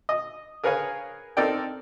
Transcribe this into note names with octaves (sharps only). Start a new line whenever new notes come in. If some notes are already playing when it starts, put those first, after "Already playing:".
D#5
G#4 A#4 B4 C#5 F5 G#5
C4 D#4 A4 A#4 D5 G5